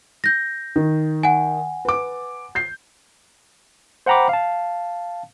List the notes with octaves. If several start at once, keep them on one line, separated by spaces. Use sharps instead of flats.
G6 A#6
D#3
F#5 G#5
B4 D6
G6 C7
C5 F#5 G5 A#5 B5 D6
F5 A5